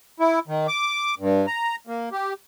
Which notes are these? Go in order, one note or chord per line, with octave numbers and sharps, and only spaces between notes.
E4
D#3
D6
G2
A#5
A#3
G4